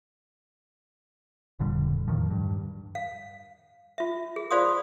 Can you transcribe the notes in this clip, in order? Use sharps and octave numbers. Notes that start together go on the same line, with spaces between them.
F1 A#2 D3 G3
E2 A2 D#3 F3
G2
F5
F4 E5
G#4
F4 C5 D5 F5 C6 D#6